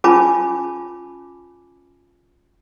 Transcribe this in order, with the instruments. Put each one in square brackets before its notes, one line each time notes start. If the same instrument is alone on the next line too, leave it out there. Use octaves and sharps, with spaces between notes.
[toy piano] C#4 F4 G#5 A5 B5 D6